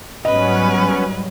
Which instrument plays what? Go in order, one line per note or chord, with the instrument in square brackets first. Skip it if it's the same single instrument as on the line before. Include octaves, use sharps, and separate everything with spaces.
[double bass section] G#2 F#3 G3 [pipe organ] B3 C#4 [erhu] B4 [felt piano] D#5